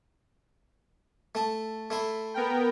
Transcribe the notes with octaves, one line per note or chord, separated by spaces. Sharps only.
A3 A5
A3 E4 C6
B3 A#4 G5